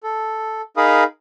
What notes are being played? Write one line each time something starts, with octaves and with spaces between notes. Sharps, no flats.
A4
D#4 G#4 A#4 F5 B5 D#6